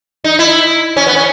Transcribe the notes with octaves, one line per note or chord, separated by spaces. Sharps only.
D#4
E4
C#4
B3
C#4